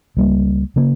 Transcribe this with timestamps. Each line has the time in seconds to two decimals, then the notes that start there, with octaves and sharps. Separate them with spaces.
0.17 C#2 C#3 G3 A#3
0.76 C#3 G3 A#3